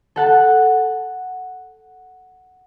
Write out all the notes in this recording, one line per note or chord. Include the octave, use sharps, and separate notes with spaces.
A4 F#5 A5